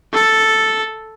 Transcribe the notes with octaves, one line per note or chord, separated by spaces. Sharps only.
A4